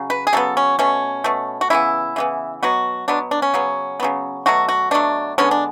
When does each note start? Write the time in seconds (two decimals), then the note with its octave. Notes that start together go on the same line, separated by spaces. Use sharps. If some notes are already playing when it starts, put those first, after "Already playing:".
Already playing: C#3 F#3
0.10 B4
0.27 G#4
0.33 C#3 F#3 B3 A4
0.57 C#4
0.79 B2 A3 C#4
1.24 B2 A3
1.61 F#4
1.70 C#3 E3 B3 E4
2.16 C#3 E3 B3
2.63 B2 F#3 B3 F#4
3.08 B2 F#3 B3 D4
3.31 D4
3.42 C#4
3.54 C#3 F#3 B3
4.00 C#3 F#3 B3
4.46 B2 F#3 A3 F#4
4.68 F#4
4.91 B2 F#3 A3 D4
5.38 D3 G#3 B3 C#4
5.51 D4